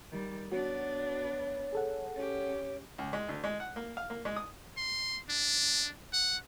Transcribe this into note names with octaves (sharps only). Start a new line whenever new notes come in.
D#3 G3
B3 D4 F#4 C#5
G#4 A4 F#5
C#4 G4 C#5
C#2
G#3
D2
G#3
F#5
A#3
F5
A#3
G#3
D#6
C6
D4
F#5